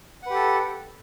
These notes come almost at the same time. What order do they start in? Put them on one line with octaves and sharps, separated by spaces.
F#5 B4 G4 A4